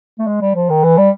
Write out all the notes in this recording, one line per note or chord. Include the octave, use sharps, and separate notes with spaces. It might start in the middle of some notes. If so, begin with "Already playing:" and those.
A3
G#3
G3
F3
D#3
E3
G3